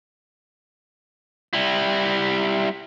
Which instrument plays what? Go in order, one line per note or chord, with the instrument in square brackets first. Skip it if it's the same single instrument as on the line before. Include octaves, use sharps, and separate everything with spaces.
[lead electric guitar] G3 E4